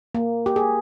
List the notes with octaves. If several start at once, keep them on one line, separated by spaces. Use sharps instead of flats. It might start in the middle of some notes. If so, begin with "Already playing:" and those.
A#3
G4
G#4